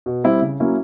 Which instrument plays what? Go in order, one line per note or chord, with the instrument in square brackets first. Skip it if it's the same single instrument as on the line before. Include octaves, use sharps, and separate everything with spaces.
[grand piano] B2
G3 C4 E4
C#3
F#3 A#3 C#4 E4